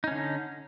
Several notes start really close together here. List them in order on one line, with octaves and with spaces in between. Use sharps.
D#4 C#4 D3